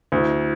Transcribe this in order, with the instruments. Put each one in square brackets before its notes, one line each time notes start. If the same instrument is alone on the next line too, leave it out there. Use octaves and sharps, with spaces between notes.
[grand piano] D2 [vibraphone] E4